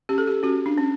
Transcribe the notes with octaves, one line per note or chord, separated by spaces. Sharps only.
C#4 G4
A4
G4
C#4 F#4
D4
C#4